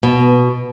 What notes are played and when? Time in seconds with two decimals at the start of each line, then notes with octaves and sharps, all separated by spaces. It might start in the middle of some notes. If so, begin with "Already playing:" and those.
0.03 B2